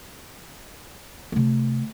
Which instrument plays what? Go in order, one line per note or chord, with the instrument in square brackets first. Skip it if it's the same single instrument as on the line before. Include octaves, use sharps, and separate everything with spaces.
[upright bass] C3 A3